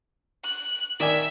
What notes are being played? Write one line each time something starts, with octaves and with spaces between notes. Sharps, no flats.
F#6
D#3 D5 E5 G#5